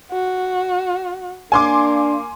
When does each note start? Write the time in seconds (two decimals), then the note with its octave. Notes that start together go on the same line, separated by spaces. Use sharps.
0.12 F#4
1.52 A#3 D4 G#5 C6 D6